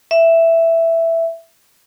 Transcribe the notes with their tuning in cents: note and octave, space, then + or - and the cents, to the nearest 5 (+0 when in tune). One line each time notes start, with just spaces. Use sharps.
E5 +5